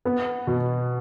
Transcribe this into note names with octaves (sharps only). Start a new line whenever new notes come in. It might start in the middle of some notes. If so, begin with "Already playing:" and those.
B3
B2